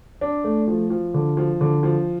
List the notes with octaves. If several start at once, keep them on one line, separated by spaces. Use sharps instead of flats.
D4
A3
F3
F3
D3
F3
D3
F3